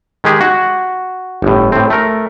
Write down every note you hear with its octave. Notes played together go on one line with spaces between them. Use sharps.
D#3 G#3 G4 G#4
F#4
G1 A2
A2 C4
A3 A#4